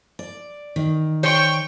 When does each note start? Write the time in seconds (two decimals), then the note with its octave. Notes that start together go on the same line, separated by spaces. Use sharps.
0.19 D5
0.76 D#3
1.23 C5 C#5 G5 C#6